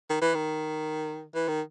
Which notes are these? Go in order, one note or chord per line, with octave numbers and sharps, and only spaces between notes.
D#3
E3
D#3
E3
D#3